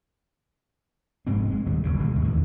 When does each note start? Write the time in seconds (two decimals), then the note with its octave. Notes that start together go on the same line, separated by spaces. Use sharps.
1.27 F1 G#2 G#3 C4
1.51 G#3
1.66 D#2 A2 D3 G3
1.83 F#1 G2 C#3
1.99 D2 B2 G#3
2.20 E2 A2 D3 D#3